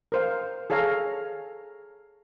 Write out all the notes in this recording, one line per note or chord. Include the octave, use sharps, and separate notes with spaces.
A#4 C5 F5
G#4 A4 C#5 F5 G#5 A#5